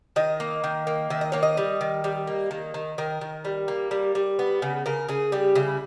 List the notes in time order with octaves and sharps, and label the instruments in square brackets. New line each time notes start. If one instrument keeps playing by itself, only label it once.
[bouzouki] D#3 D#5
A#3
D#3
A#3
D#3 E5
D#5
A#3 C#5
D#5
G3
D#3
G3
A#3
D#3
D#3
D#3 A#4
D#3
G3
A#3
G3
G3
B3
C#3
C#3 A#4
C#3 G#4
G3 G4
C#3 E4